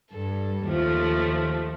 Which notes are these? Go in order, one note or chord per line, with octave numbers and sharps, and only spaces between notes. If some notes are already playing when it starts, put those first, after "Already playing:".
G2 A4
D#2 F3 A3